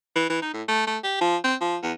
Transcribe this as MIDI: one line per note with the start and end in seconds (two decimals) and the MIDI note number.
0.15 0.28 52
0.30 0.41 52
0.42 0.53 63
0.53 0.62 45
0.68 0.85 57
0.87 0.98 57
1.04 1.17 67
1.21 1.37 53
1.44 1.55 60
1.61 1.77 53
1.83 1.93 40